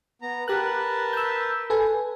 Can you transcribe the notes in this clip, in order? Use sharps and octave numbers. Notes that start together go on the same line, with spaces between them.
B3 A#5
G4 A#4 B4 A5 F#6
E6 G6
A4 B4 G#5